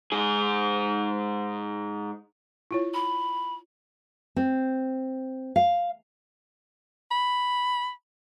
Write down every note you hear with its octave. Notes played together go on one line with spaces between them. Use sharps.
G#2 G#4
E4 F4 C#5
B5
C4
F5
B5